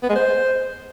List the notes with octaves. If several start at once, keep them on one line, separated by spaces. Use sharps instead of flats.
B3
G#3
C5